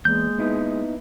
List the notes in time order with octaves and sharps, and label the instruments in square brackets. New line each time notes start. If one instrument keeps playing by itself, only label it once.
[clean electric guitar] E2 [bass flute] G#3 [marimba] A#3 [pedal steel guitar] G6
[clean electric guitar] B3 D#4 E4